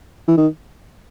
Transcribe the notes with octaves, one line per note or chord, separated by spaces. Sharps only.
E3
D#3